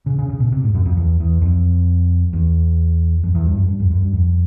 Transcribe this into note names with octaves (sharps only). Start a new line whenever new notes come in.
C#3
C#3
C#3
B2
C3
G#2
F#2
F2
E2
E2
F2
E2
F2
E2
G2
F#2
G2
F2
F#2
G2
F2